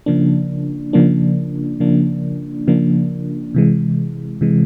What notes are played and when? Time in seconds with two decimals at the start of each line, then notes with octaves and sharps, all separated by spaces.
0.06 C#3 F3 A#3 D4
0.93 C#3 F3 A#3 D4
1.80 C#3 F3 A#3 D4
2.68 C#3 F3 A#3 D4
3.54 C3 E3 G#3
4.41 C3 E3 G#3